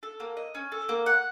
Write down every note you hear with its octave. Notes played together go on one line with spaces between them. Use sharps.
A4
A#3
D#5
C#4
A4
A#3
F#5